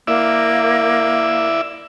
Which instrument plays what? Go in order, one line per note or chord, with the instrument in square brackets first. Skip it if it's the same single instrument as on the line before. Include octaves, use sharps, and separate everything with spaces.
[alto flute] A#3 [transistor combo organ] E4 D5 E5